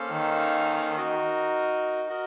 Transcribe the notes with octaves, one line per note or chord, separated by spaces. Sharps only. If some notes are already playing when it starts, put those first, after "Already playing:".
Already playing: A#3 C#4 A4 C5 F5
D#3
D#4 F#4 A#4 D#5
F#4 A#4 D#5